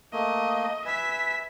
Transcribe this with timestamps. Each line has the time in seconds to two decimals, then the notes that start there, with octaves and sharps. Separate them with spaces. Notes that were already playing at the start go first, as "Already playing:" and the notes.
0.13 A3 A#3 D#5
0.85 B4 E5 G#5 B6